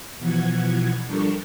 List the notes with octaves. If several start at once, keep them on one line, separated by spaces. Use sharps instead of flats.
B2 E3 F3 F#5 G#6
F3 G3 D4 A4 A#4 C#6